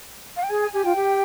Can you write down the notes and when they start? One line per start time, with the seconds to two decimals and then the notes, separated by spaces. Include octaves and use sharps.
0.37 F5
0.43 G5
0.50 G#4 G#5
0.62 G#5
0.73 G4 G#5
0.85 F4 G5
0.96 G4